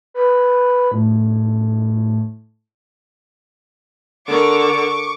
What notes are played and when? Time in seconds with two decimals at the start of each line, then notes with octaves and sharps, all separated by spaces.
0.14 B4
0.91 A2
4.28 D3 A#4 C#6 D6